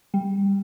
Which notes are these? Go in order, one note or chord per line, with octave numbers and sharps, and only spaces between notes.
G3